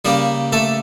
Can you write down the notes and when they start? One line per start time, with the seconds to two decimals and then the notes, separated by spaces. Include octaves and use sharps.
0.05 C#3 G3 A#3 G4
0.52 A3 A4